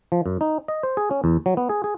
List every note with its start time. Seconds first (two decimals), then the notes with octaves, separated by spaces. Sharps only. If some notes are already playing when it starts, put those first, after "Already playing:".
0.12 F3
0.26 F#2
0.41 D#4
0.68 D#5
0.83 C5
0.97 G#4
1.11 C#4
1.24 E2
1.46 F#3
1.57 B3
1.69 G#4
1.84 G#4